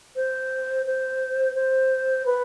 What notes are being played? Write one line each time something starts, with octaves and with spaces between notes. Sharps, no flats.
C5
C5
C5
B4